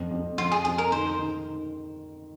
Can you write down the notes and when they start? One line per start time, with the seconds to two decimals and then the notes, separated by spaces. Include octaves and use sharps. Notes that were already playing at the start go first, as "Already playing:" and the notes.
Already playing: F2
0.11 F2
0.38 F2 F4
0.52 G#4
0.65 F2 G#4
0.78 A#4
0.92 D#3 C5
1.19 D#3